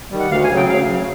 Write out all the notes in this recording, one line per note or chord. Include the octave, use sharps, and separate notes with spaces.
D#3 G3
F#5
D2 F5
G#5
C#3 F#3
G5
D2 F5
C#3 F#3